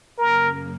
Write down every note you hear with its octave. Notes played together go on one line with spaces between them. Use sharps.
F#2 C#3 A#3 A#4